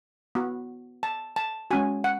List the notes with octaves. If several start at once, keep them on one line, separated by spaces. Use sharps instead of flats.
B3 F#4
A5
A5
G#3 C#4 F#4 G#5
F#5